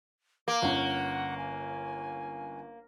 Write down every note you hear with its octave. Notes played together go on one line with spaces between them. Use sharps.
A#3 D6
G1 C#4 F#5
G#5